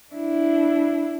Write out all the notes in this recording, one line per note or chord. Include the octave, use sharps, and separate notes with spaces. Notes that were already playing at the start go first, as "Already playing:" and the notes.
D4 E4